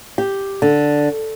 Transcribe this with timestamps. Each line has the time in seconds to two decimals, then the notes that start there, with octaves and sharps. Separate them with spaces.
0.18 G4
0.62 D3